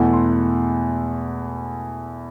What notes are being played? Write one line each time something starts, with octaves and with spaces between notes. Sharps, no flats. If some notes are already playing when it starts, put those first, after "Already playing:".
Already playing: E2 B2 A3 E4 F#5
C6